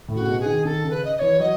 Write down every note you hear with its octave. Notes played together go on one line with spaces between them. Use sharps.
A2
F#4
C#3
B2
G#4
D#3
D#3 A4
C#3
B4
D#5
D#5
E3 C#5
F#3 D#5